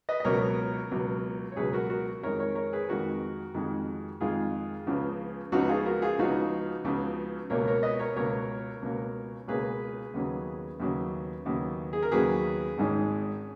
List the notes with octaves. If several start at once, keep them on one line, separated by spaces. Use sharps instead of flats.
B4 D#5
D#5
C#2 B2 F#3 A#4 C#5
C#2 B2 F#3
C#5
C#2 B2 F#3 G#4 B4
F#4 A#4
F#4 A#4
F2 D#3 G#3 A#4 C#5
A#4 C#5
A#4 C#5
G#4 B4
F2 D#3 G#3 F#4 A#4
F2 D#3 G#3
F2 D#3 G#3 F4 G#4
C#2 C#3 F3 B3
C#2 C#3 F3 B3 D#4 F#4
F4 G#4
F#4 A#4
F4 G#4
C#2 C#3 F3 B3 D#4 F#4
C#2 C#3 F3 B3
C#2 B2 A#3 C#4 A#4 C#5
A#4 C#5
B4 D#5
A#4 C#5
C#2 B2 A#3 C#4 A#4 C#5
C#2 B2 A#3 C#4
C#2 B2 A#3 C#4 G#4 B4
D#2 C#3 F#3 B3
D#2 C#3 F#3 B3
D#2 C#3 F#3 B3
G#4
A#4
D#2 C#3 F#3 B3 G#4 B4
G#1 G#2 D#3 G#3 C#4